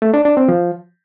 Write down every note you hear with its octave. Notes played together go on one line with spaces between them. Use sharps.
A3
D4
D4
C4
F3